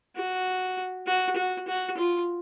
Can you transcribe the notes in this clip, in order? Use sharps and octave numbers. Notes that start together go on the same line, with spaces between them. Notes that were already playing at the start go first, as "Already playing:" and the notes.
F#4
F#4
F#4
F#4
F4